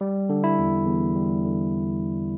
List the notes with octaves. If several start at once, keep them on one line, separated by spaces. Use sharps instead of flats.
G3
D3
E4
E2
E2
G3
D3